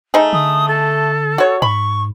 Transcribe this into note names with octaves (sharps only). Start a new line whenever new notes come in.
A3 D#4 G#4
D3 D#6
A4
F#4 C#5
G#2 B5 C#6